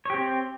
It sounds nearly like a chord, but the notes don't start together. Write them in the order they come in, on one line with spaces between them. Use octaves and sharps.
C#5 G4 C4